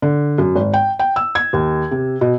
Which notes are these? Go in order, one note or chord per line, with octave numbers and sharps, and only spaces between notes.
D3
F#2
G#1
G5
G5
E6
G#6
D#2
C3
B2